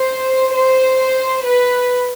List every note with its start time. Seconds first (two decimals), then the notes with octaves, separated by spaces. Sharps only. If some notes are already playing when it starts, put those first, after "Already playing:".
Already playing: C5
0.55 C5
1.46 B4